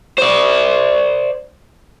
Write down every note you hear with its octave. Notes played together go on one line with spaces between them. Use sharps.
C5 D5